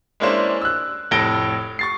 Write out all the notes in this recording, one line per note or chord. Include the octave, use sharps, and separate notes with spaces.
G#3 A#3 C#4 D4 E4 C5
E6 F#6
F1 A2 A4 A#6 D7 G7
C#6 A6 C7